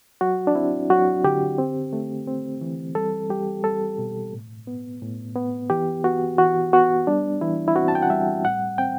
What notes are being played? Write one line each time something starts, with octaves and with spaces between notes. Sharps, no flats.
F#3 F#4
D4
C4 E4
F#3 F#4
D3 G4
C4
A3
C4
E3
G3 A4
G3 G4
G3 A4
B2
A2
B3
A2
B3
E3 G4
B3 F#4
E3 F#4
B3 F#4
G3 D4
E3 E4
E4
C4 F#4
A5
G5
F#5
G3 E5
A2 F#5
C4 G5